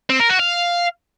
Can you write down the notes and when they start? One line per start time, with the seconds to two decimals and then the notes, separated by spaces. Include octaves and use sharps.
0.10 C4
0.20 A#4
0.30 F#4
0.39 F5